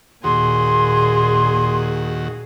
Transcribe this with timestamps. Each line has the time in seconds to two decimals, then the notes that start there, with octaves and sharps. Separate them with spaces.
0.24 D#2 A#2 F#4 G#4 C6